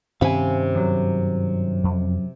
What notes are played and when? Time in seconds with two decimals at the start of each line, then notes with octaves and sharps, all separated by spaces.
0.21 G2 C3 D#3 C#4 F5 G#5 B5
0.75 F#2 F#3
1.84 F2